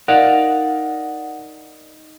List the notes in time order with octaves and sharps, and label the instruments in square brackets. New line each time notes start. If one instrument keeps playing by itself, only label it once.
[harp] D#4 [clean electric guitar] A#4 D5 F5 [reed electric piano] F#5